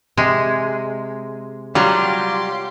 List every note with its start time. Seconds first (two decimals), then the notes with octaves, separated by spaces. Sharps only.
0.17 C3 G#3
1.75 F#3 G3 F4 G4 C6